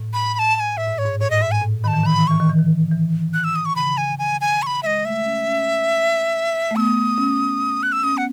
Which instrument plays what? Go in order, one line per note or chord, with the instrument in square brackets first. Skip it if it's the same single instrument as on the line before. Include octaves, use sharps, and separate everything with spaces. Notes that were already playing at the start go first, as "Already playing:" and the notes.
Already playing: [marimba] A2
[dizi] B5
B5
A5
A5
G#5
[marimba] A2 [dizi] E5
[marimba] G#2
[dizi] C#5
[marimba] G#2
[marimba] A2 [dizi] C#5
[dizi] D#5
[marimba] G#2 [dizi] E5
[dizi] G#5
[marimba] A2
[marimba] D#3 [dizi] A5 B5
[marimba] E3
[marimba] D#3 [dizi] B5
[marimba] E3
D#3
[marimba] E3 [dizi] C#6
[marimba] D#3
E3
D#3
E3
[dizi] F#6
E6
D#6
C#6
[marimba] C#3 [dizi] B5
[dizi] G#5
G#5
G#5
C#6
B5
[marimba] G#3 [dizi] D#5 E5
[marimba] A3 [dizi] E5
[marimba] C#4
C#4
A3
[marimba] B3 [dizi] E6
[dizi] D#6
[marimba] C#4
[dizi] F#6
E6
[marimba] C#4 [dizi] D#6
[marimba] B3
[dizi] F#5